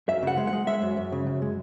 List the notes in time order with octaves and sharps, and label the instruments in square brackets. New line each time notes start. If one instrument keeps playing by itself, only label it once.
[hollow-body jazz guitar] F#2 E5
C#3 F#5
G#3
F#5
G#3
G#3 E5
F#2
F#2
C#3
F#2
G#3